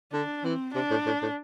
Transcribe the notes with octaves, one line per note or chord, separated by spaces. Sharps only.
D3 D4
E3 C4
C3 D4
A2
A2
A2